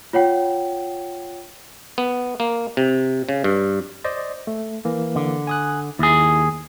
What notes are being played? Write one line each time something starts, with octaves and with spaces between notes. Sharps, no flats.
F4 C#5 F#5 G5
B3
A#3
C3
C#3
G2
C5 D5 D#5
A3
E3 A#3
D3
G#5 D#6 F#6
D#2 E4 G#4